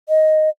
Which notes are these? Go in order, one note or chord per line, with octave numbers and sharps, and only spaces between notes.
D#5